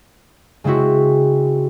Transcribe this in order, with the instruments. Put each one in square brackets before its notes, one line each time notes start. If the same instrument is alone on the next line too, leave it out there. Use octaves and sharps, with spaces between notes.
[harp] C#3 G#3 C4 E4 F#4